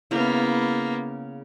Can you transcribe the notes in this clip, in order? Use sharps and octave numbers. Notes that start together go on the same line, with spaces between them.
C#3 A#3 B3 E4